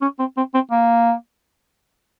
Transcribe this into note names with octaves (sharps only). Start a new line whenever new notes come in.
C#4
C4
C4
C4
A#3